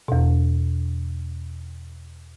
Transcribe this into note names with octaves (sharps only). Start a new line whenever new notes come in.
E2 B2